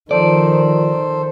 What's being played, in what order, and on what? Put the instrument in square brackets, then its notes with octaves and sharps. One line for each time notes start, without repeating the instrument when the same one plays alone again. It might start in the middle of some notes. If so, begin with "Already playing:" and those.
[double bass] D#3 [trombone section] F3 [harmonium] A4 C5 [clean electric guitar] D5